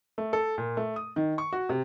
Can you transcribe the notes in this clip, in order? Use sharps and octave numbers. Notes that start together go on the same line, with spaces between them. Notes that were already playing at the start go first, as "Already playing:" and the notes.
A3
A4
A#2
A3
D#6
D#3
C#6
F#4
C3